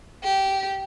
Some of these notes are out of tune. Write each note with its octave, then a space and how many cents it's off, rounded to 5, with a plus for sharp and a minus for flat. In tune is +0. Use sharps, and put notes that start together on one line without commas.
G4 -15